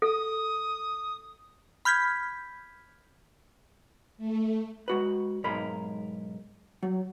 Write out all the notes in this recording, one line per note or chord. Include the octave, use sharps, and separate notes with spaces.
A4 D#6
B5 F6 G6 G#6 B6
A3
G#3 F#4 B4
B1 G#2 G#3 A#4 B5
F#3